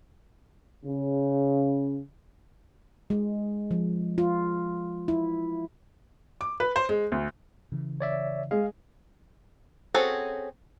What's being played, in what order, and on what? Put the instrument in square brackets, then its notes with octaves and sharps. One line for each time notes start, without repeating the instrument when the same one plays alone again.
[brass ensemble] C#3
[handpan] G#3
F3
F4
E4
[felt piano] D6
B4
C5
G#3
D2
[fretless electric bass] C#3 E3
[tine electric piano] C#5 D5 E5
[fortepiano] G#3 [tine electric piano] F5
[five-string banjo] C4 C#4 F#4 G#4 A4